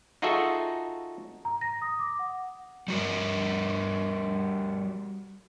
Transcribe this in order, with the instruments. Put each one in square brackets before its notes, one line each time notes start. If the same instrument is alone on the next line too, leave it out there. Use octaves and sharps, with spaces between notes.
[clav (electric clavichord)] D#4 F4 F#4 G#4 A4 E5
[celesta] A#5
A#6
D#6
D6
F#5
[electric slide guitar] G3 F#4 A#4